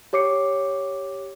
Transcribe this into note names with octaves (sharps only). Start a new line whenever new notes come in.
G4 C#5 D6 C7 C#7